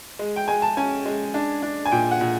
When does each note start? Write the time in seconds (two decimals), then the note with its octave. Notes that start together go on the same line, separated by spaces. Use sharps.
0.19 G#3
0.36 G5
0.48 G#3 G#5
0.62 A5
0.77 C#4 G#5
1.06 G#3
1.34 D4
1.63 D4
1.86 G#5
1.92 A#2 G5
2.11 F#5
2.21 A#2